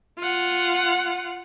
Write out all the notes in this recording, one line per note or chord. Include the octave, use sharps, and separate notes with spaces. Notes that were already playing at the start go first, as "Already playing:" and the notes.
F4 F#5